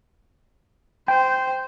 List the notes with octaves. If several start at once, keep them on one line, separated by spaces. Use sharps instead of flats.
C5 G5